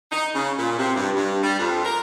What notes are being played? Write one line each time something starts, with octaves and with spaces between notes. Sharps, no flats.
D#4
C#3
A#2
C3
G2
G2
G3
F2
A#4